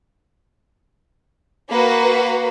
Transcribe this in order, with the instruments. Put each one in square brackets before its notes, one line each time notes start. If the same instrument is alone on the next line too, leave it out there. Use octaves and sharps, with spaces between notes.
[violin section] A#3 F#4 B4